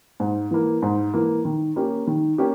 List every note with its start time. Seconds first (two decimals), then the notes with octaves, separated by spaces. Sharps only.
0.20 G#2
0.51 E3 A#3
0.82 G#2
1.14 E3 A#3
1.45 D#3
1.76 A#3 C#4 G4
2.07 D#3
2.38 A#3 C#4 G4